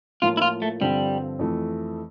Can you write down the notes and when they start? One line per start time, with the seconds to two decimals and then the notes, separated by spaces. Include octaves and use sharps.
0.22 A2 F3 A#3 F4
0.37 E4
0.42 F4
0.62 A3
0.81 G2 D3 F3 G3 C4 F4
1.39 F2 E3 A3